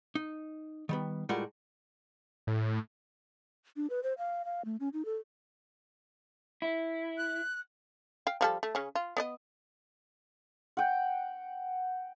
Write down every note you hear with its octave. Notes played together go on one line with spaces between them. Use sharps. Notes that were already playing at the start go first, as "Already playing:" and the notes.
D#4
D#3 G3 B3
A2 G3 G#3 F4 A#4 F#5
A2
D4
B4
C5
F5
F5
A3
C#4
D#4
A4
E4
F#6
F5 G5
F3 G3 A4
A3
C#3 C#4
F4
B3 D5 D#5
F#5 G5